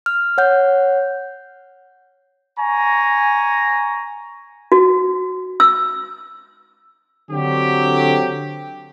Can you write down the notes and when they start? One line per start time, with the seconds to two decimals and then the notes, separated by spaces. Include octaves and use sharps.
0.06 F6
0.38 C#5 F#5 G6
2.58 G#5 A#5 C#6
4.72 F#4
5.60 E6
7.30 D3 F#3 C4 G4